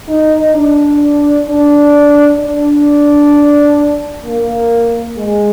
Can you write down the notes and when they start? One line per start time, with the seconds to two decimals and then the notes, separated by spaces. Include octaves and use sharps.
0.09 D#4
0.55 D4
1.47 D4
2.40 D4
4.25 A#3
5.17 G#3